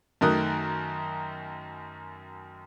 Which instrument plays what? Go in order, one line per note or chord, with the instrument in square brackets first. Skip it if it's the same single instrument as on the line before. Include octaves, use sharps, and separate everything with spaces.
[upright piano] F#2 D#3 A3 A#4 D#6 F#6